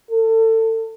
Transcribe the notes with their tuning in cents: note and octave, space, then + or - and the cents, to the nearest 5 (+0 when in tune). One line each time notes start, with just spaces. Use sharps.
A4 +30